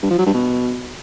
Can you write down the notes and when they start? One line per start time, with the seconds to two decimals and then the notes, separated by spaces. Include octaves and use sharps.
0.03 G2
0.10 F3
0.18 F#3
0.26 G2
0.34 B2